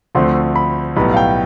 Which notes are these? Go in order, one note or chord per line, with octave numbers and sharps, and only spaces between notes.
D2 D3 F3 A3 C4 C6
B5
B1 A2 G3 B3 B5
F5
G5